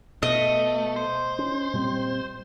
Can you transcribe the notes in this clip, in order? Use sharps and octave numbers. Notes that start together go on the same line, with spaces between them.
B2 A3 D#5
C5
C#4
A#2 G3 C4